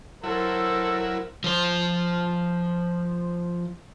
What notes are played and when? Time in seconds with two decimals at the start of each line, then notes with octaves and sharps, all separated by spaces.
0.23 F#3 E4 A4 A#4 C5
1.44 F3 C5